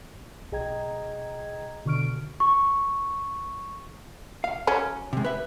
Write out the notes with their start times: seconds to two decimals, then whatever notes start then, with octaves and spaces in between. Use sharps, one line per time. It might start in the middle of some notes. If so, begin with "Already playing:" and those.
0.52 B1 G#4 D#5 G5 A#5 G#6
1.85 B2 D3 C#6 F6 D7
2.40 C#6
4.44 F5
4.67 F#3 C#4
5.13 C3 G#3
5.24 B4 E5